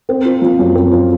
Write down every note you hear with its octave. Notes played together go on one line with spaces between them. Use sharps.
C4
F4
F3
F#2
C4
F4